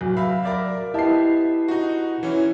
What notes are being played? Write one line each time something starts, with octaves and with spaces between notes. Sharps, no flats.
D1 F#3 F#4
E5 F5 B5
A#4 D5 E5
B3 E4 G4 D#5 E5 A5 C7
D#4 F#4
E3 C#4 E4